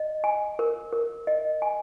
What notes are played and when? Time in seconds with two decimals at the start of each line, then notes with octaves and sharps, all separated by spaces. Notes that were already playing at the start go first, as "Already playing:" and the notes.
Already playing: D#5
0.24 G#5
0.59 A#4
0.93 A#4
1.27 D#5
1.62 G#5